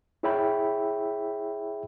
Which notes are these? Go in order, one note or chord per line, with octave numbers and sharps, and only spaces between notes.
E4 G#4 C#5 E5 G5 B5